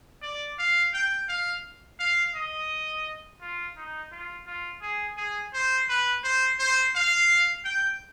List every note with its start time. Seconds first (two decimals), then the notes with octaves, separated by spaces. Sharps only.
0.22 D5
0.58 F5
0.94 G5
1.29 F5
2.00 F5
2.35 D#5
3.41 F4
3.77 D#4
4.12 F4
4.46 F4
4.82 G#4
5.17 G#4
5.53 C5
5.89 B4
6.23 C5
6.59 C5
6.95 F5
7.65 G5